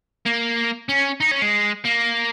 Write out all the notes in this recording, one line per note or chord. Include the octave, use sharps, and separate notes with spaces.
A#3
C#4
D#4
C#4
G#3
A#3